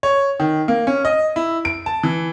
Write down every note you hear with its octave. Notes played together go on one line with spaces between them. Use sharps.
C#5
D#3
A#3
C#4
D#5
E4
D7
A5
E3